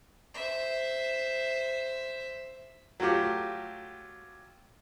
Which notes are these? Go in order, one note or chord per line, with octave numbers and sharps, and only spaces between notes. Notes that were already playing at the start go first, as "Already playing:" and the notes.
C5 E5
F#3 A3 F4 G4